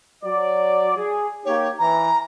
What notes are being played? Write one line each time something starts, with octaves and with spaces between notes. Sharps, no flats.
F#3 D5
G#4
A#3 D#4 G4 C#5
E3 A#5